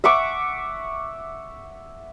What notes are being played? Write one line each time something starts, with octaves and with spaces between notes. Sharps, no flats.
E5 F#5 C#6 D6